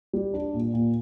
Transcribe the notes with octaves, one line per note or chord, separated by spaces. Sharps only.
G3
D4
A#2
A#2